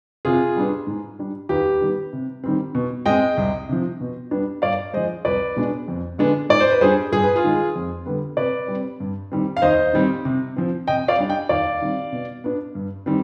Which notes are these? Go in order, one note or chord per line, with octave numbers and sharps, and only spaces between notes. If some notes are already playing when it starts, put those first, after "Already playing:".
C3 F4 G#4
G3 B3 D4
G#2
G3 D4
D#2 G4 B4
D#3 G3 B3
C3
D#3 G3 C4
B2
G#3 C4 D#5 G5
C2
C3 F3
B2
G3 B3 D4
G2 D5 F5
F3 G#3 C5 D#5
C2 B4 D5
B2 G#3 B3 D4
F2
D3 G#3 B3 D4
G#2 D5
C5
B4
G3 D4 G#4 C5
G2 G#4
B4
F4 G#4
D#3 G#3
F2
D3 G3 B3
C3 B4 D5
G3 C4
G2
D#3 G3 C4
F5
D#2 C5 D#5
D#3 G3 C4
C3
F3 C4
C3 D#5 G5
D5 F5
G3 D4
D#5 G5
D#2 D5 F5
D#3 G3 C4
B2
B3 D4
G2
D#3 G3 C4